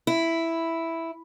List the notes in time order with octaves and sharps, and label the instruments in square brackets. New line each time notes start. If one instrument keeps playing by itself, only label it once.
[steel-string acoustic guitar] E4